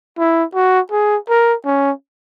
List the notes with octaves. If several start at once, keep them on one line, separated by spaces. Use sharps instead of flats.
E4
F#4
G#4
A#4
C#4